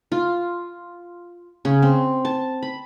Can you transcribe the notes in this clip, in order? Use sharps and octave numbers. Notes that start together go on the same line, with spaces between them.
F4
C#3
C4
A5
B5